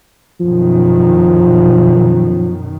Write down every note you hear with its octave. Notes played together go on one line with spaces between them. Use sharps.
F#2 B2 D#3 F3